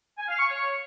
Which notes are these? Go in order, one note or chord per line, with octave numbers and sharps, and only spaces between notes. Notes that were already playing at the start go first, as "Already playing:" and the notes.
G#5
F5
C#6
C#5